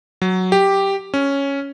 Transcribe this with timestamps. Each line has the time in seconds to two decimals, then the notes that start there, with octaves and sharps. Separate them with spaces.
0.22 F#3
0.52 G4
1.14 C#4